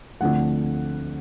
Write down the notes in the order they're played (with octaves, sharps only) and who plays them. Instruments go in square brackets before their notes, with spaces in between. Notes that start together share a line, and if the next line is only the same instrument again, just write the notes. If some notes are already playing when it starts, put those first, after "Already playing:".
[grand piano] D2 D3 F3 A3 C4 F#5